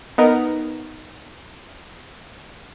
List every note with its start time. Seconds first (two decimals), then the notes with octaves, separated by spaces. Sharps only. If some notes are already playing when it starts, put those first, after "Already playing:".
0.18 B3 D#4 A#4